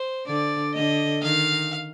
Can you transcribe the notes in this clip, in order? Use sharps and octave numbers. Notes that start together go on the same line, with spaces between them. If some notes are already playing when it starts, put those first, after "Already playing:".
Already playing: C5
D3 D5
D3 D#5
D#3 F5